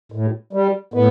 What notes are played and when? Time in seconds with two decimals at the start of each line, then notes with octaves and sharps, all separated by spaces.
0.12 A2
0.53 G3
0.94 A2 B3